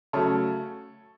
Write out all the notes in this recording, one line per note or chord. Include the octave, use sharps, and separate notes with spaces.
C#3 F#3 A3 A4 C#5